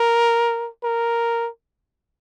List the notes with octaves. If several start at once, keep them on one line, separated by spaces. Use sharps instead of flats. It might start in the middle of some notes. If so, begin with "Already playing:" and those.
Already playing: A#4
A#4